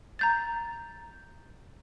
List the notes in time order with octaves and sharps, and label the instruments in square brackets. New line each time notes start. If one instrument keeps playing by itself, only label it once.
[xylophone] A#5 G6 A6